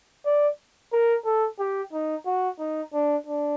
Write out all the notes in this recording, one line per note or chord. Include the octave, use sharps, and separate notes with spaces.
D5
A#4
A4
G4
D#4
F#4
D#4
D4
D4